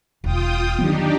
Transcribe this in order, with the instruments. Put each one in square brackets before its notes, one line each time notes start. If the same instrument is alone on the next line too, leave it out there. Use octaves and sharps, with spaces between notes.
[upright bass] E1 D#2 [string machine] F4 G5 D#6
[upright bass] G2 D3 [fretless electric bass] D#3 F#3 B3 [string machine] D4 D#4 G4